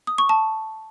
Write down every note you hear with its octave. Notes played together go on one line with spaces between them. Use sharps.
D#6
C#6
A5